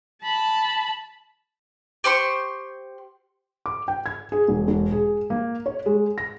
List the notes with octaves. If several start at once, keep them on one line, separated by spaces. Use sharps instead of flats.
A5 B5
G4 C5 C6 C#6
D6
G5
G#6
G#4
E1
E1
G#4
A#3
C#5
G#3
A#6